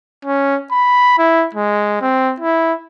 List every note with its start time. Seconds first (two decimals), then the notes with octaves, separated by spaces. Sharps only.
0.25 C#4
0.71 B5
1.18 E4
1.54 G#3
2.01 C4
2.40 E4